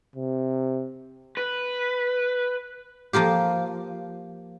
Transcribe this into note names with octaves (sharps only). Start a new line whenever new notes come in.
C3
B4
F3 A#3 F4 G4